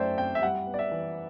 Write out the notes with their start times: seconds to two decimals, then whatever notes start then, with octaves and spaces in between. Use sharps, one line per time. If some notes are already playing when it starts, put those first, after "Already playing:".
Already playing: F#2 F#3 A3 C5 D5 E5 G5
0.18 C4 G5
0.35 E5
0.42 G3 F#5
0.66 B3
0.74 D5
0.79 E5
0.92 E3